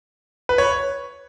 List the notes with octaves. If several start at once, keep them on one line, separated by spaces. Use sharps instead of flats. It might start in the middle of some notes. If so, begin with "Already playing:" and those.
B4
C#5